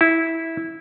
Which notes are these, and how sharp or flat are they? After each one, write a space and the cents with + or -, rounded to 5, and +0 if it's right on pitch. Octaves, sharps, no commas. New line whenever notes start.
E4 -10